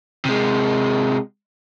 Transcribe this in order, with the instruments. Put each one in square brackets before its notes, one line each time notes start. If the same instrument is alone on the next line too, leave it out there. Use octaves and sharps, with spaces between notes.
[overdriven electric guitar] C3 G#3